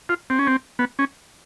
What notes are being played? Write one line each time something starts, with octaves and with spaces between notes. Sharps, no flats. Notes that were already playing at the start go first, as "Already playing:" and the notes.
F4
C4
C#4
C4
B3
C#4